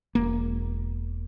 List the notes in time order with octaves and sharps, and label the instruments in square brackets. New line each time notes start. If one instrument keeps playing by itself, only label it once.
[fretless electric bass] E1 A#3